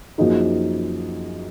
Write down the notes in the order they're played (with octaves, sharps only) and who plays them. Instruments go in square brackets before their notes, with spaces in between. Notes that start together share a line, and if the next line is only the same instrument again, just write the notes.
[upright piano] F#2 F3 A#3 D#4 G#4